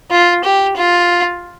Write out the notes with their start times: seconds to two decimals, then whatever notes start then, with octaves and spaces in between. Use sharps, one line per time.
0.11 F4
0.44 G4
0.76 F4